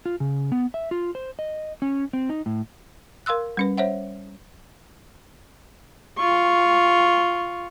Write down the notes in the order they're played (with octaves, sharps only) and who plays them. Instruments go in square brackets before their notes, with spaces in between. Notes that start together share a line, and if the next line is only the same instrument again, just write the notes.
[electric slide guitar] F4
C#3
B3
E5
F4
C5
D#5
C#4
C4
D#4
A2
[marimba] A#4 F5 C6 E6 F#6
G3 C#4 B4
C5 C#5 E5 F#5
[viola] F4 C#6